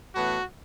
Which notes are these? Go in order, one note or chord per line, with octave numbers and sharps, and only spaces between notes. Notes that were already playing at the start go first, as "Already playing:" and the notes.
A2 E3 B3 F#4